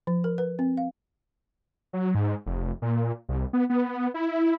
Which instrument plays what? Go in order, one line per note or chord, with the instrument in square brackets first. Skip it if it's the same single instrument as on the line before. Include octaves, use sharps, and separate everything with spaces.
[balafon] F3
A#4
B4
C4
F5
[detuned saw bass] F#3
G#2
F1
A#2
C2
B3
B3
E4